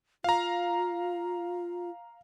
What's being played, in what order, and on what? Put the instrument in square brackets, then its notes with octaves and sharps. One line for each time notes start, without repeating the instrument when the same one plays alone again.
[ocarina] F4 [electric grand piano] F5 A#5